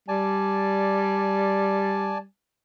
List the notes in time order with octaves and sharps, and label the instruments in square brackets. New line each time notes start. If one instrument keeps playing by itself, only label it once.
[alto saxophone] G3 [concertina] D5 G#5 A5